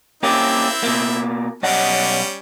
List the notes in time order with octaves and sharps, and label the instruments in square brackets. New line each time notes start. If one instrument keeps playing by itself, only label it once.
[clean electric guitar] A#3 C#4 G4 [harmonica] C4 E4
[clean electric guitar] B2 A#3
[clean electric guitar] B1 D#5 F#5 [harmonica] G3 C#4